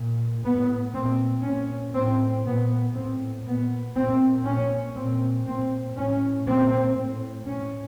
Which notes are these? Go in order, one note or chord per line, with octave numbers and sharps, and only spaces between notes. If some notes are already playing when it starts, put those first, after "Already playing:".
Already playing: A#2
A2 B3
A#2 C4
A#2 C#4
A2 C4
A#2 B3
A2 C4
A#2 B3
A#2 C4
A#2 C#4
A#2 C4
A#2 C4
A2 C#4
A#2 C4
A2
A2 C#4